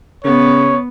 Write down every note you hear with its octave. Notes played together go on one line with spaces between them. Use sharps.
C#3 B3 C#5